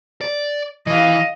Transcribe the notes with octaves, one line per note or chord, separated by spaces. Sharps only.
D5
E3 D#5 F5